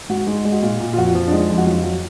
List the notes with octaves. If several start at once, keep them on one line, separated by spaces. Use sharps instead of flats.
G#2 F#4
G#3 D#4
G#3
F#4
A#2 F4
A#2
F4
F2 F#4
F3
D4
G#3 D#4
F2
F#4
F#3 F4
F#3